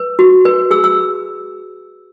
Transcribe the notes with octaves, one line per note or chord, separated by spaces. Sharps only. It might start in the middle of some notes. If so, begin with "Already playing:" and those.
Already playing: B4
F#4
B4
G#4 E6
E6